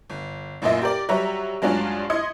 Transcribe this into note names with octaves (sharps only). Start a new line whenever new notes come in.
G1
A1 F#2 A#2 A#3 D#5 E5
G4 A#4 D5
F#3 G3 C#5 E5 A#5
G2 F#3 G#3 C#4 D4 F4
E4 D#5 C6 D#6 G#6 C#7